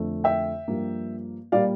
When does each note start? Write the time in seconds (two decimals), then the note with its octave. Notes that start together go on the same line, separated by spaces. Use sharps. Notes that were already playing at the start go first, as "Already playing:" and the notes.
Already playing: F2 D3 A3
0.24 E5 G5
0.68 G2 F3 A#3
1.52 A#2 G3 A#3 D5 F5